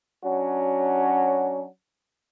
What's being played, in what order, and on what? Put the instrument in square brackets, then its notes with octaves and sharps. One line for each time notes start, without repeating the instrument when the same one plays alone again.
[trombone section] F#3 C#4 D4 F#4